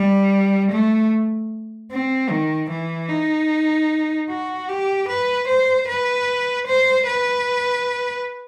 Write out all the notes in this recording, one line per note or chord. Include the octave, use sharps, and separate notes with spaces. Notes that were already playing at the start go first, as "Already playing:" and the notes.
Already playing: G3
A3
C4
D#3
E3
D#4
F#4
G4
B4
C5
B4
C5
B4